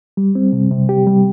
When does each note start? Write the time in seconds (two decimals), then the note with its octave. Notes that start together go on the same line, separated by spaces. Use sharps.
0.17 G3
0.35 C4
0.53 C3
0.71 C3
0.89 G4
1.07 G3